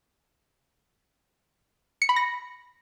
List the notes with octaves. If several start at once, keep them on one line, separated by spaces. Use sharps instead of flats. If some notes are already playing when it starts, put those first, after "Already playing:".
C#7
B5
A#6